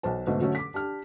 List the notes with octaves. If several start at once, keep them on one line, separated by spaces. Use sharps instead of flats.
B1 F#4 C5 A5
G#2 B2 D3 A3
D3 F#3 A3 C#4
D6 B6
D4 G4 F6